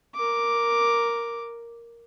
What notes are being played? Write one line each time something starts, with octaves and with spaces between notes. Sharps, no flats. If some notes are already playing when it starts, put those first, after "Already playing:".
A#4 D6